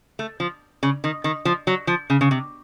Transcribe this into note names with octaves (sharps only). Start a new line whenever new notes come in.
A3
F3
C#3
D#3
D#3
F3
F#3
F3
C#3
C#3
C3